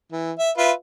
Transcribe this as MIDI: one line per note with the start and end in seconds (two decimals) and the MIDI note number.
0.12 0.32 52
0.38 0.51 76
0.58 0.72 65
0.58 0.72 71
0.58 0.72 76